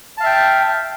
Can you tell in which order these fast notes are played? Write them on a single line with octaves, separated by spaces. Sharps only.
A5 F5 E5 G5